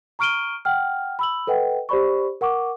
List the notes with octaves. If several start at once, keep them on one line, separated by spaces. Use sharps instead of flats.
A#5 C#6 F6 D7 D#7 G7
F#5 G5 F6
B5 E6 F#7
A4 B4 D#5 F#5 G5
G4 C5 D5 B5 C#6
A#4 F#5 C#6 D6